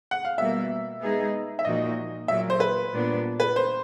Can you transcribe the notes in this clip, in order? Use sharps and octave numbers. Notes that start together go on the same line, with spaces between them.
F#5
F5
B2 G3 A#3 E5
G#3 B3 D#4 G#4
E5
A#2 F3 A#3 D#4 F#4 D#5
A#2 F#3 A#3 E5
C5
B4
A#2 G3 B3 D4
B4
C5